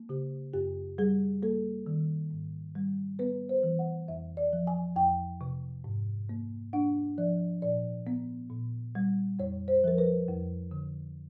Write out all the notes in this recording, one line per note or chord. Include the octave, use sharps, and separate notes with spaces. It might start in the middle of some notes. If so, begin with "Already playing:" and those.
Already playing: A#3
C#3 G4
F#2 G4
G3 G#4
A#3 A4
D#3
G#2
G3
B3 B4
C5
E3
F#5
F2 E5
D5
F3
G#5
F2 G5
C3
G#2
A#3
D4 F#5
F3 D5
A#2 D5
B3
A#2
G3
F2 C#5
C5
F3 A#4
B4
F2
D3